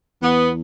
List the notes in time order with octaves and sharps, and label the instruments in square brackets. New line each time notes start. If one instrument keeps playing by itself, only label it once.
[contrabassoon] E2 [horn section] B3